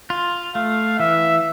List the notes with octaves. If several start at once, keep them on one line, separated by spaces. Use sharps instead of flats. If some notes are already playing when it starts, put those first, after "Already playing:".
F4
A3 F5
E3 E5